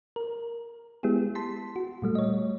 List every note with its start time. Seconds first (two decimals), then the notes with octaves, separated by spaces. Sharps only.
0.16 A#4
1.03 G#3 B3 E4 G4 G#4
1.35 A5 C6 B6
1.76 F#4
2.02 A#2 G3 A3
2.15 C#5 D#5